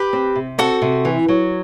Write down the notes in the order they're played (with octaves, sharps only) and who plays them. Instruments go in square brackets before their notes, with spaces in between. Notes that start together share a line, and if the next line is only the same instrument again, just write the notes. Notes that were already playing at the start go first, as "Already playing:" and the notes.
Already playing: [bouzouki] G4 B4
[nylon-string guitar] C4
C3
[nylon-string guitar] C4 [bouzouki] F#4 A4
[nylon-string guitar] C3
E3
F#3